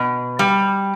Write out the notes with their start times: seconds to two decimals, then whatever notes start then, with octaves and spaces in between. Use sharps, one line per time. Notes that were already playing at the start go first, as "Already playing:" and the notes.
Already playing: B2
0.39 G3